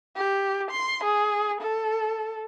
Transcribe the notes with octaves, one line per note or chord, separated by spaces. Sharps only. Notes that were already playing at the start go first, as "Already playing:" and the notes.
G4
C6
G#4
A4